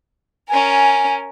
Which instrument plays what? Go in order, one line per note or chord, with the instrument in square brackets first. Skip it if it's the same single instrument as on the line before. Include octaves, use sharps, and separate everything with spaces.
[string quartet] C#4 A#4 [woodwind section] G#5